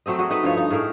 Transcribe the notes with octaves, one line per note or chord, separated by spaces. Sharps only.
F#3 A3 C4 D#5
F#4 G#4 D#5
A3 D#4 B4 D#5
G2 F3 C#5
D#4
A2 A3 G#4 A#4